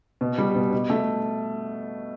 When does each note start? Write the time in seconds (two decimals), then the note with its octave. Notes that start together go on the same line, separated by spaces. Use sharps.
0.21 B2
0.38 G3
0.55 B2
0.73 B2
0.90 A3